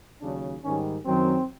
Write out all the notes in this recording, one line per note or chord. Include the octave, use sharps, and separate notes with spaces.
D#2 C#3 F#3 D4
G#2 D#3 G3 C#4
F#2 D#3 F#3 C4